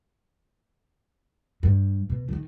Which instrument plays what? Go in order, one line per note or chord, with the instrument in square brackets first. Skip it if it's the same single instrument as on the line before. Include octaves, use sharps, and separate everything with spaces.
[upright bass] G2
B2
D3 D#3